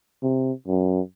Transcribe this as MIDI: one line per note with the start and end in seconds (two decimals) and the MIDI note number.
0.23 0.52 48
0.68 1.00 42